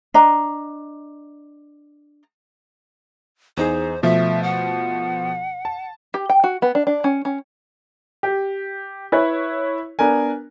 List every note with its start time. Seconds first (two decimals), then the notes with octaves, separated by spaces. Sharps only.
0.14 D4 D#5 A#5
3.57 E2 D#4 G#4 C5
4.03 B2 F3 A3 E5
4.43 F#5
5.65 A5
6.14 G4
6.29 G5
6.44 F#4
6.62 B3
6.75 D4
6.87 D4
7.04 C#4
7.25 C#4
8.23 G4
9.12 E4 B4 C#5
9.99 B3 D4 A#4 G#5